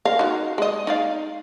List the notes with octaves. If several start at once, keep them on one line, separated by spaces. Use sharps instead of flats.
A#4 F5
D#4 F#4
G#3 D#5
D#4 D5 F5